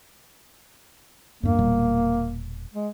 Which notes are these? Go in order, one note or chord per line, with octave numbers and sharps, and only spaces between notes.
E2 G2 A#3
E1 A#2 G3
G#3